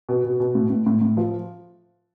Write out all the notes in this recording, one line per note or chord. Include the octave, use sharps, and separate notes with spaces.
B2
B2
B2
A2
A2
A2
A2
F3